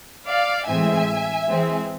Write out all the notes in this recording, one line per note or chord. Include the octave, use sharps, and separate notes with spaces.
D5 F5
A2 E3 G#3 C4 E5 G#5
E3 G#3 C4